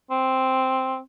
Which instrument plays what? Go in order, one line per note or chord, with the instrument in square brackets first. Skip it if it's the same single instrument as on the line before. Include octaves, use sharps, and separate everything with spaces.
[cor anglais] C4